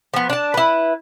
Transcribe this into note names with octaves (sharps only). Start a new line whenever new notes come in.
F3 B3
D4 A5
E4 B4